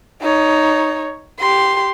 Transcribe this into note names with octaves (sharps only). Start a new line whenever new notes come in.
D#4 C#5
G4 C6